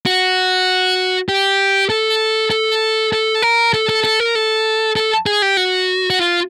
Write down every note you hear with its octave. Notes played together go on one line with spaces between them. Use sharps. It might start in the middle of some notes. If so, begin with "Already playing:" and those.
F#4
G4
A4
A4
A4
A#4
A4
A4
A4
A#4
A4
A4
G#4
G4
F#4
F#4
F4